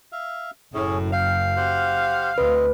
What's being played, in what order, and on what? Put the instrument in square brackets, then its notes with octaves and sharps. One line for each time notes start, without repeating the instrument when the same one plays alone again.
[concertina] E5 F5
[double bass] F#1 F#2 [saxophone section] A2 [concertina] C#4 G#4
[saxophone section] F5 [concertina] G5
[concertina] G4 C5 F#5
[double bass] D2 [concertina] C4 D#5 [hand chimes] B4